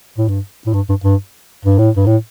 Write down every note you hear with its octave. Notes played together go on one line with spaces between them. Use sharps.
A2
G2
A2
G2
G2
G2
G2
A2
G2
A2